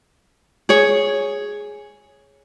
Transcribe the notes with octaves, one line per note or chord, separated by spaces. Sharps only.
G#4 C#5